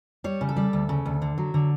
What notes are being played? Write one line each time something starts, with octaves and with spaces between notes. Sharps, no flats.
G3 C#5
C#3
A4
G3
D2
C#3
D2
D3
F#3
D3